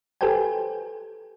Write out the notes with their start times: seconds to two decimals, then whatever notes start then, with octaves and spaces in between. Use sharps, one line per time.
0.21 G4 A4 B4 C5 G5 G#5